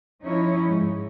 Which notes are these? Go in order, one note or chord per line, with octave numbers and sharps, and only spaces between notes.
F3 C#4 D#4 E4 C#5
G#2